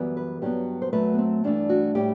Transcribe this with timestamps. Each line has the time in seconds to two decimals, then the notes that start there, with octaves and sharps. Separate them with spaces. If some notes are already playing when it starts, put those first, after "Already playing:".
Already playing: F#2 E3 G3 B3
0.17 B4
0.42 G2 F#3 B3 G4
0.82 C5
0.93 F#2 F#3 A3 B4
1.14 B3
1.18 C4
1.44 G2 E3 A3 D4
1.69 F#4
1.95 A2 G3 G4